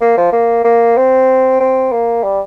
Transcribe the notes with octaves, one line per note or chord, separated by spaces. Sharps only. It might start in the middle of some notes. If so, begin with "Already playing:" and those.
A#3
F3
A#3
A#3
C4
C4
A#3
G3